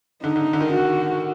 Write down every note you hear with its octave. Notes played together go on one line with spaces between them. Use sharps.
D3 D#4
D3
D3
D#3
F#4